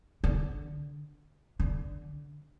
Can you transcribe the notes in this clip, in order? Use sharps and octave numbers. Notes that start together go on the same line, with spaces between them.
D3
D3